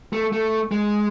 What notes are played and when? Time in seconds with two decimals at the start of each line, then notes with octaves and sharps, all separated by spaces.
0.13 A3
0.33 A3
0.72 G#3